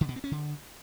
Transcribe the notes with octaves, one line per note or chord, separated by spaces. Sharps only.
D3
B2
C4
C#4
D3